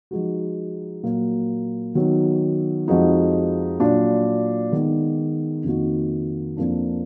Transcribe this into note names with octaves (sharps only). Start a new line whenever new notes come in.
F3 G#3 D#4 F#4
A#2 F#3 A#3
D#3 F#3 B3
F2 F3 G#3 D#4 F#4
A#2 F#3 D4 F4
D#3 G#3 B3
F2 D#3 A#3 D#4 F#4
F2 F3 A#3 D4